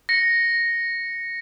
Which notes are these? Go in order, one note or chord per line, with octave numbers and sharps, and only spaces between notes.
A#6 C#7